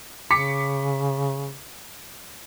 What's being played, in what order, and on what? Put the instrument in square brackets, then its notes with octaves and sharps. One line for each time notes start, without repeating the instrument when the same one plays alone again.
[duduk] C#3 [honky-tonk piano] D6 B6 C#7